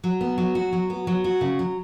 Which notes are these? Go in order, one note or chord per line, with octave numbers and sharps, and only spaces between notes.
F#3
B3
F#3
F#4
F#3
B3
F#3
F#4
C#3
F#3